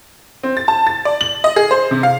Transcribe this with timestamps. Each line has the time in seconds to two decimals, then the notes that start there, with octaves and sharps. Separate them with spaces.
0.43 C4
0.57 A6
0.68 A5
0.87 A6
1.05 D5
1.21 F#7
1.44 D#5
1.56 G#4
1.71 C5
1.91 C3
2.03 F5